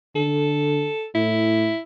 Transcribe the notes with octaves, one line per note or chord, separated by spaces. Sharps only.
D3 A4
A2 E4